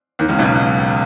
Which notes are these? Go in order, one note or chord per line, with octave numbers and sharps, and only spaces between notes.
D#2 D#3
C#2 C#3
B1 B2